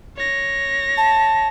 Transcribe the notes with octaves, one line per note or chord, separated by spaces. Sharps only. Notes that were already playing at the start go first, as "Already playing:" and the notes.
C#5 A#6
A5